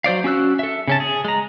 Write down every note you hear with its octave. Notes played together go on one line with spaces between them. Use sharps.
F#3 C5 D5 F5
C#4 F#4 E6 F#6
A4 E5
C#3 C#4 A5
G#4
G#3 A#5